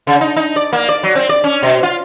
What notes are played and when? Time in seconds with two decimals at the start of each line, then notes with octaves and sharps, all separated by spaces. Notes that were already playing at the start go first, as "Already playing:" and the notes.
0.07 C#3
0.21 D#4
0.36 D#4
0.56 D5
0.73 A#3
0.89 D5
1.03 F#3
1.15 C4
1.29 D5
1.44 C#4
1.63 B2
1.83 F4